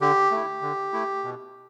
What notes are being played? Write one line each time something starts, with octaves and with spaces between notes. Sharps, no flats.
D3 G4
A3 E4
D3
A3 E4
B2